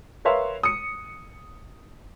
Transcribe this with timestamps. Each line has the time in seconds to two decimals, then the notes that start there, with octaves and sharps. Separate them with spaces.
0.25 A#4 B4 C#5 E5 F5 C6
0.63 D#6 C#7